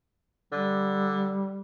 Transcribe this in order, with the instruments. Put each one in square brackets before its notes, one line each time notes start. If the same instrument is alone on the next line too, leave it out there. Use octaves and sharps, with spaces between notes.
[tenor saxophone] D3 [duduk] G3